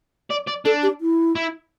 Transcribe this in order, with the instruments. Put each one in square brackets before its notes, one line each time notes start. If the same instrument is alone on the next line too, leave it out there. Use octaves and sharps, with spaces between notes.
[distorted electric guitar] D5
D5
[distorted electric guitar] D4 [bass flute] A4
[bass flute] G4
E4
[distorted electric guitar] E4